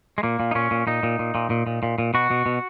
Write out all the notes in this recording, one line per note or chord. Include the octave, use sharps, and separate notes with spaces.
G#3
A#2 A#3
A#2
D#4
A#2 C#4
A#2
A#2 D#4
A#2
A#2
A#2
A#2
A#2
A#2
A#2
B2 F#4
B2
B2